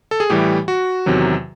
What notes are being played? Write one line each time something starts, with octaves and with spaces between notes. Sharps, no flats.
A4
G#4
A2 E3 G3 G4
F#4
E2 C3 D#3 F#3